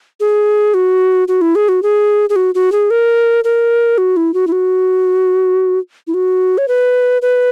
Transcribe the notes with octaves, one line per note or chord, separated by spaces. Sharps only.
G#4
F#4
F#4
E4
G#4
F#4
G#4
G#4
F#4
F#4
G#4
A#4
A#4
F#4
E4
F#4
E4
F#4
E4
F#4
C#5
B4
B4